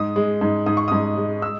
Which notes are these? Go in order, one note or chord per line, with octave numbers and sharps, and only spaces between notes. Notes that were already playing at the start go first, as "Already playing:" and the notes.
Already playing: G#2 D#6
G#3
G#2
G#2 D#6
C#6
G#2 D#6
G#3
E6